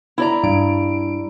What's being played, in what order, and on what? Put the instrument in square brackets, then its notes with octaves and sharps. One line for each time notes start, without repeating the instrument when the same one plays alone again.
[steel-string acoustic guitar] E4 D5 A#5
[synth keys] G2 D7